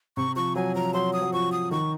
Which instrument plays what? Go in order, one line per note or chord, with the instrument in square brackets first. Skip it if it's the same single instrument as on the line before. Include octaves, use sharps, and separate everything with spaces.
[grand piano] C3 [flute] C#6
[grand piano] F3 [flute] C#6
[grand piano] F#3 [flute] G#5
[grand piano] F3 [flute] A#5
[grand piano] F#3 [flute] C6
[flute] D#6
[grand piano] F#3
[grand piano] F3 [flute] C#6
[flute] D#6
[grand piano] D#3 [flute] C#6